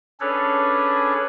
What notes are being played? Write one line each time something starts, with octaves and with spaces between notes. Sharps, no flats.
C#4 D4 G#4 A4 B4 C#5